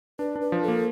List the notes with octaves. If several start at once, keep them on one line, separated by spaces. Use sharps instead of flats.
D4 B4
D4
B4
F3
A4
A#3